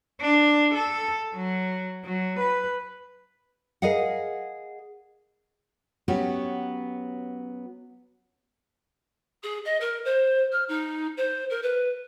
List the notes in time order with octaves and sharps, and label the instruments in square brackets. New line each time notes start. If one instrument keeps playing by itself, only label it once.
[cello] D4
A4
F#3
F#3
B4
[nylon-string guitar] G#4 A#4 D#5 F5 F#5
F#3 B3 C#4 F#4 G4 C#5
[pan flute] G#4
D#5
A#4
C5
F6
D#4
C5
A#4
B4